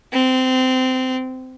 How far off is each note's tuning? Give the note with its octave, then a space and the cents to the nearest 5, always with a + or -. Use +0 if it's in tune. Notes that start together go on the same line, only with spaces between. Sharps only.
C4 -20